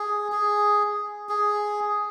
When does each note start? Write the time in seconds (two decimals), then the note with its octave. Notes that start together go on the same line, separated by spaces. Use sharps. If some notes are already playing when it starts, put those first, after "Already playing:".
Already playing: G#4
0.32 G#4
1.29 G#4